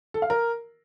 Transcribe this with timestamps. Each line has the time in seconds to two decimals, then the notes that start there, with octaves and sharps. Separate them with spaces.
0.14 A4
0.22 F5
0.30 A#4